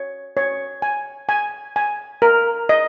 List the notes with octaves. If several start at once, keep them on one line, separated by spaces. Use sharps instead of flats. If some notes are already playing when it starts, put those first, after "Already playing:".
Already playing: C#5
C#5
G#5
G#5
G#5
A#4
D#5